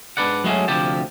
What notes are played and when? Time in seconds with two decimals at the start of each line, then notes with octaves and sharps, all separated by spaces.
0.17 G#2 D4 B4 D5 F#5
0.44 F#3 G#3 A3 C#4 F#4 G#4
0.68 D2 C3 F3 G4 A5